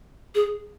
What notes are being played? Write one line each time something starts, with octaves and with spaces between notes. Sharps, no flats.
G#4